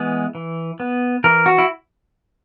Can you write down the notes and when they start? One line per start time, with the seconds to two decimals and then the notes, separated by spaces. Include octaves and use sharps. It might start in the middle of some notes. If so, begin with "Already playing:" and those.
Already playing: E3 G#3 B3
0.35 E3
0.80 B3
1.24 E3 A#4
1.46 F#4
1.58 E4